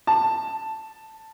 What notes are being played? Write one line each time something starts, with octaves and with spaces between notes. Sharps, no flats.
A5